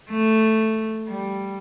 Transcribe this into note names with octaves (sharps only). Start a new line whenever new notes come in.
A3
G3